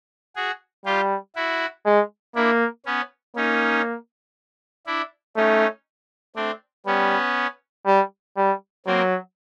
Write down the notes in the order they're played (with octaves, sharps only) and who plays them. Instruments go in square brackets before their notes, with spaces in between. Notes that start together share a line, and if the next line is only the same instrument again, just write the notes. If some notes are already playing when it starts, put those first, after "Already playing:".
[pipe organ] F#4 G#4
[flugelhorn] G3 [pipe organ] F4 G4
[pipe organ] E4 F#4
[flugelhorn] G#3
[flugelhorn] A#3 [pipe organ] D4 E4
[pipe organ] B3 C#4
[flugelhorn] A#3 [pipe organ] C#4 D#4
[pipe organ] D4 E4
[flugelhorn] A3 [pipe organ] C#4 D#4
[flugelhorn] A3 [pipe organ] C4 D4
[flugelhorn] G3 [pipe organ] B3 C#4
[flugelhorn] G3
G3
[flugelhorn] F#3 [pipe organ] A#3 C4